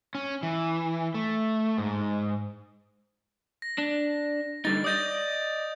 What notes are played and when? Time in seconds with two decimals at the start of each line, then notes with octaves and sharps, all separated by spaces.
0.15 C#4
0.43 E3
1.14 A3
1.78 G#2
3.62 A#6
3.78 D4
4.65 D3 G3 D#4 A6
4.84 D5 D#5 D#6 G6 A6